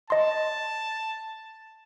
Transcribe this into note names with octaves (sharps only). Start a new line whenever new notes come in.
D#5 A5 C6